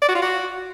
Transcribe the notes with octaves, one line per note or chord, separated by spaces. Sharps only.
D5
F#4
F4
F#4